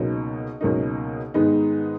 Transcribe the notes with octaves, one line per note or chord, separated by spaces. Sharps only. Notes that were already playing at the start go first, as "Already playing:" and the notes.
Already playing: C#2 B2 F#3 A#3 D#4
C#2 B2 F#3 A#3 D#4
G#2 D#3 G#3 B3 D#4